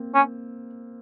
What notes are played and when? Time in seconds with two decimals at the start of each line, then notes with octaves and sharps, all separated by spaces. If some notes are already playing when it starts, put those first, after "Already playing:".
Already playing: A#3 C4
0.15 C#4